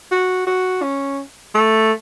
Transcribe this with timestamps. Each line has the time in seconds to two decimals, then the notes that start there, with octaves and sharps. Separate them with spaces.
0.11 F#4
0.47 F#4
0.83 C#4
1.55 A3